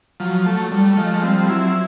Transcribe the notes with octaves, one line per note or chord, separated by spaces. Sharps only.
F3 F#3
A3
G3 A3
F3 G#3
G3 C4
F#3 E4